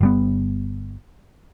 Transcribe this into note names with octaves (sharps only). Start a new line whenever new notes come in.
G1 G3 B3